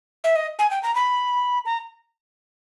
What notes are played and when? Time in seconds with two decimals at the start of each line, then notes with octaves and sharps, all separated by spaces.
0.24 E5
0.36 D#5
0.59 G#5
0.71 G5
0.83 A#5
0.95 B5
1.65 A#5